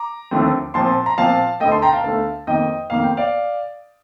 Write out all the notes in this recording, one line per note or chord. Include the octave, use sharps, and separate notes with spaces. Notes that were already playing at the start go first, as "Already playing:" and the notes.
Already playing: A#5 D6
D#2 D3 F3 A3 C4
A#2 F3 C4 A5 C6
A#5
A#2 F3 C4 F5 A5
D2 D3 A3 D#5 G5
A5 C6
G5 A#5
F5 A5
D2 D3 A3
F2 D#3 A#3 D#5 G5
F2 D#3 A#3 F5
G5
D5 F5